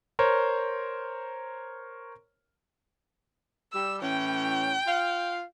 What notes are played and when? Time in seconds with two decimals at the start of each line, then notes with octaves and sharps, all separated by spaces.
0.19 A#4 C5 C#5
3.73 G3 E6
4.02 A2 E3 C#4 G5
4.87 F4 F5